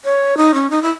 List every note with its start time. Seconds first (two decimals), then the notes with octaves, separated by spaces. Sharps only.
0.05 C#5
0.37 D#4
0.54 C#4
0.70 D#4
0.82 E4